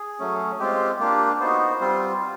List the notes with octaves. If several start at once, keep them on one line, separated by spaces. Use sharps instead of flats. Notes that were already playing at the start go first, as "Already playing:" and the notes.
Already playing: G#4
F#3 A3 C#4
G#3 C4 F4 G4
A#3 D4 F4 G4
B3 D#4 F#4 C5
G3 C4 F4
F4